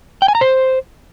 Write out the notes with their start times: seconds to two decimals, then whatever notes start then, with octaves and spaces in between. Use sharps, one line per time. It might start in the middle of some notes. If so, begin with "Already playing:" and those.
0.22 G5
0.28 G#5
0.35 A#5
0.41 C5